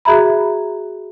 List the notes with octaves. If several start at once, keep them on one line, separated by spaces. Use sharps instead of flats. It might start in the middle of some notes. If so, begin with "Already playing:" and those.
F#4 G#4 E5 A#5 B5